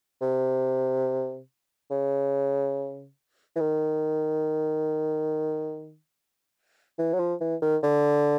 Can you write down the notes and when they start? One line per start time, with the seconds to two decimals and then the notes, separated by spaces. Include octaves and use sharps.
0.21 C3
1.90 C#3
3.56 E3
3.60 D#3
6.99 E3
7.14 F#3
7.19 F3
7.41 E3
7.62 D#3
7.83 D3